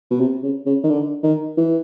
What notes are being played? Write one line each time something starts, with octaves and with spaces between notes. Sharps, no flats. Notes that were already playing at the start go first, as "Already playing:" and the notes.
B2
C3
C#3
C#3
D#3
D3
D#3
E3